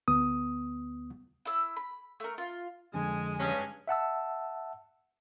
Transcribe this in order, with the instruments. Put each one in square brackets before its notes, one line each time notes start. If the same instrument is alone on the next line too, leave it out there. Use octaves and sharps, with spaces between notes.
[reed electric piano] D2 B3 D#6
[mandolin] E4 E6
B5
A3 A#4
F4
[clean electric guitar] F2 D3 [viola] G#3 [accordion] G#5
[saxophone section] G2 C#4
[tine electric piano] E5 F#5 A5 E6